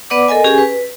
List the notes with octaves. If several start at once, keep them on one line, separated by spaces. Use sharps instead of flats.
B3 B4 D5 F#5 D6
A4 A#4 D#5 G#5
C#4 G4 G#4 G#5
B4